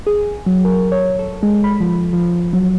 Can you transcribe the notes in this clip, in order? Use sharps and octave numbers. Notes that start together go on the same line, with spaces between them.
G#4
F#3
A#4
C#5
A4
G#3
B5
F3
F3
F#3